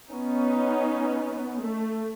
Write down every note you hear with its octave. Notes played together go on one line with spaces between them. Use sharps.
B3 C#4 D#4
A3